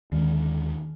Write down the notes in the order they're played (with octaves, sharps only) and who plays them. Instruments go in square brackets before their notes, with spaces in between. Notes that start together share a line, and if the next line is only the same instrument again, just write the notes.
[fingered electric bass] D#2 D3 G#3 [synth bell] D#3